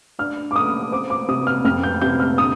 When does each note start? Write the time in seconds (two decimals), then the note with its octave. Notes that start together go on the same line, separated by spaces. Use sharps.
0.19 D4 F6
0.51 D6
0.56 A3 D#6
0.92 C4 D6
1.10 D6
1.28 C3 D#6
1.47 F6
1.65 F2 F6
1.83 G6
2.01 C3 G6
2.20 F6
2.38 D3 D#6